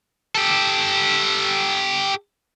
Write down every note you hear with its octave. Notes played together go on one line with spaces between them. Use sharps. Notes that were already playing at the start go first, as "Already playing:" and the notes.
G4 A4